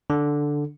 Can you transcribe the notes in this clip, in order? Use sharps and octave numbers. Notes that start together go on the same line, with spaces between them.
D3